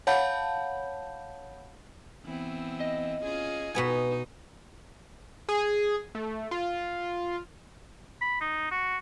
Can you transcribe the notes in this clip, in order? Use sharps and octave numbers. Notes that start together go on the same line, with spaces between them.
C#5 F5 F#5 A5 B5 G6
E3 B3 C4
D#5
C#4 F4 G#4
B2 B3 D#4 G#5
G#4
A3
F4
B5
D#4
F#4